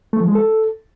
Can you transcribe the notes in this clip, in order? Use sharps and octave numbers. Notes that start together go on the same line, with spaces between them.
A3
F3
G#3
A4